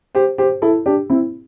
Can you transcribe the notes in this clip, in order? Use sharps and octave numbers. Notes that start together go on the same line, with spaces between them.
G4 C5
G4 C5
E4 A4
D4 G4
C4 E4